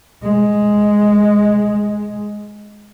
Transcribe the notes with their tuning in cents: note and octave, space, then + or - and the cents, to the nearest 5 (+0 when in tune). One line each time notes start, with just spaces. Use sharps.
G#3 +5